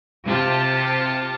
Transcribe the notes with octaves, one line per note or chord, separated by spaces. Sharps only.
C3 F4 G4 A5